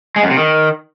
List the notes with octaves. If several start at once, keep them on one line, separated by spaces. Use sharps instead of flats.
G#3
F#2
C3
D#3